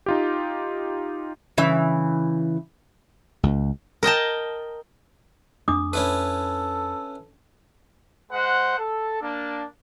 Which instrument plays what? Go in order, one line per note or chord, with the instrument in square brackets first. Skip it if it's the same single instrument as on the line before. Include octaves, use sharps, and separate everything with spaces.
[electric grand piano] D#4 F4 G4
[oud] C#3 E3 E5
[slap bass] C#2
[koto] A#4 D#5 G5 A5
[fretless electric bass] F2 A3 [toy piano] D4 D6 D#6
[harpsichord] C#4 E4 B4 [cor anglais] A4
[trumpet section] G#3 C5 F#5
A4
A#3 D4